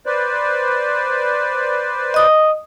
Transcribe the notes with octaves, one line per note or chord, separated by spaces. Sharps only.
B4 C5 D5
D#5 D#6